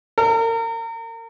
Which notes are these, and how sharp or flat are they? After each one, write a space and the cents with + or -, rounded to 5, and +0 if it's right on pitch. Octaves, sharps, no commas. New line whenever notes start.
A#4 -35